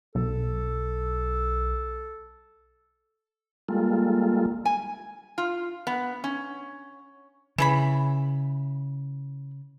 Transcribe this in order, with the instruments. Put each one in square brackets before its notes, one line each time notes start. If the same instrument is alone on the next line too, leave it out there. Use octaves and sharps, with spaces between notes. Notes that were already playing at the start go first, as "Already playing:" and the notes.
[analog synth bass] B1 [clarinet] A4
[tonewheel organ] G3 G#3 A#3 F4 A4
[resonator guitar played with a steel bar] G#5
F4
B3
C#4
[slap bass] C#3 [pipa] E3 G#4 B5